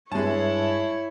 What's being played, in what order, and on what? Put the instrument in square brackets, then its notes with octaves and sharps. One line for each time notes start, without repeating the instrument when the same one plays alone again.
[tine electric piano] G2 E5 [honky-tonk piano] G#3 A5 [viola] E4 C#5